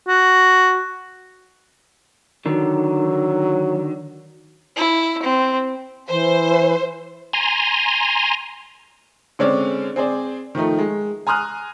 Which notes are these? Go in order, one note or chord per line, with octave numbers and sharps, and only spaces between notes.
F#4
D3 D#3 F#3
E4
C4
E3 C5
G#5 A#5 C6
D3 G#3 C4 C#4 C#5 D5
C4 G#4 C5 D5
D#3 F3 A3 D#4
G#3
G#5 A#5 C6 D#6 F6 F#6